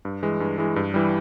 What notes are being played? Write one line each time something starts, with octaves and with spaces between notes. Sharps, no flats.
G2
E3 G#3
G2
E3 G#3
G2
E3 G3